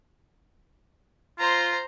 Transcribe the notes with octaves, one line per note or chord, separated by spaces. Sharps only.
F4 C5 A#5